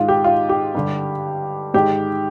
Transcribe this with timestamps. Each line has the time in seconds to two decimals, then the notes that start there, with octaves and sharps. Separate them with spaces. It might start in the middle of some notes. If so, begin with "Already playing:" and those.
Already playing: G#2 D#3 F4
0.08 G4
0.24 F4
0.49 G4
0.75 G2 D3
1.74 G#2 D#3 G4